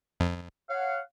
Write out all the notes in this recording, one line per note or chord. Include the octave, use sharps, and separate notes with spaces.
F2
C#5 F5 F#5